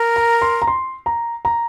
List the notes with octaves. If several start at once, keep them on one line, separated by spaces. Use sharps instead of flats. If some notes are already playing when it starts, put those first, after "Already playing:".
Already playing: A#4
A#5
C6
A#5
C6
A#5
A#5